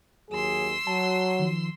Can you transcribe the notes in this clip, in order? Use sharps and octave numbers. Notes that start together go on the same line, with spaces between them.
D#2 F#3 G#4 C6 E6
F#3 A5
D#3 F3